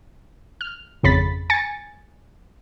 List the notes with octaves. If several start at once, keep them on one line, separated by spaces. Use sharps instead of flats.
F6
G#1 F2 C#3 B5 A6 B6
G#5 A6 C#7